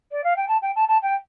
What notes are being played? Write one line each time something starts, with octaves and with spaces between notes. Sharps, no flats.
D5
F5
G5
A5
G5
A5
A5
G5